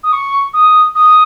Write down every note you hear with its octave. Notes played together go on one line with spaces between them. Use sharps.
D#6
C#6
D#6
D#6